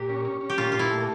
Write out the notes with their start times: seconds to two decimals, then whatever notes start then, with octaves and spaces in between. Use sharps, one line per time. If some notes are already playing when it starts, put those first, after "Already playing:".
Already playing: A#2 G4
0.09 C#4
0.25 C#4
0.41 C#4
0.50 G4
0.57 A#2 F4
0.72 A#2 F4
0.79 E4
0.90 A3